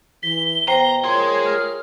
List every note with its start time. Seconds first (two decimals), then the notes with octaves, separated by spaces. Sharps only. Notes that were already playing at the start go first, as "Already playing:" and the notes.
0.23 E3 B6 G7
0.68 B2 C5 G5 A#5 C7
1.04 F4 G#4 A#4 C#5 C6 G#6
1.45 F6